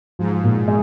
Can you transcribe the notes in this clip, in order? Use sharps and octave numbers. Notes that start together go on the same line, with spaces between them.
G#2 F3
A#2
G#3